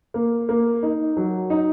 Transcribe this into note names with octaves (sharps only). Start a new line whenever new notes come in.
A#3
A#3
D#4
F#3
D#4